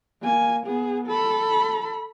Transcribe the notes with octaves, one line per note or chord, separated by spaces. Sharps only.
A#3 G#5
B3 G#4
A4 B5